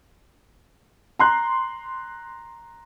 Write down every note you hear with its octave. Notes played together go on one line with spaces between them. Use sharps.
A#5 C6 F#6